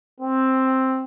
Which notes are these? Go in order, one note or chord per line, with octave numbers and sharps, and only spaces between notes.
C4